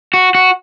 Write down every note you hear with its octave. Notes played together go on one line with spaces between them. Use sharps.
F#4
F#4